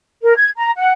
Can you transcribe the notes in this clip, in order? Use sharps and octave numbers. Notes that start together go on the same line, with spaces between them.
A#4
G#6
A#5
F#5